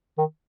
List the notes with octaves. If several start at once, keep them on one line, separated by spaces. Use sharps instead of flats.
D#3